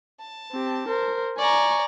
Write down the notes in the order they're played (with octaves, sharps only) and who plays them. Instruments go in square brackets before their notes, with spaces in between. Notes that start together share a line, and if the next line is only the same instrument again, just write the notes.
[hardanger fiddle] A5
[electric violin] C4 G4
A#4 C5
[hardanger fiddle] D5 A#5 [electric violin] G#5 C#6